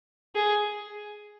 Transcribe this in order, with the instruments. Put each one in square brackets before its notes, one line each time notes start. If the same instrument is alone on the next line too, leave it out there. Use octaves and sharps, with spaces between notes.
[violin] G#4